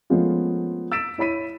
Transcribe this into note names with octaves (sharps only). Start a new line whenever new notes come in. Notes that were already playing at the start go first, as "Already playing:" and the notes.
F3 G#3 A3 B3 C#4 F4
E6 A6 B6 D7 E7
E4 C#5 B5 B6 D#7